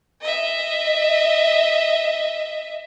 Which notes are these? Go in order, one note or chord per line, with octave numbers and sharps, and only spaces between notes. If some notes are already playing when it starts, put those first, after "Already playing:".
D#5 E5